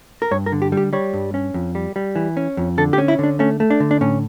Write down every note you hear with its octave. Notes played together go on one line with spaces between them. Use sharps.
A#4
G2 C#5
A#4
D3
G4
G3
G4
G3 C#5
G2
C#4
F2
G3
G3
E3
C#4
F2
D3 A4
G4
C#4
E4
D3 D4
A3 C#4
A3
D4
D3
D4
A2 C#4